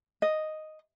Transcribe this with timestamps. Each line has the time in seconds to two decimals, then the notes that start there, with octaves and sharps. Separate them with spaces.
0.22 D#5